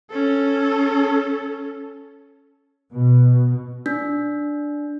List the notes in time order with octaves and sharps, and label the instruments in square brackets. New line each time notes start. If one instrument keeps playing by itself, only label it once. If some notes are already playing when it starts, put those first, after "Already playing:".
[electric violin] C#4 A4
[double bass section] B2
[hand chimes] D4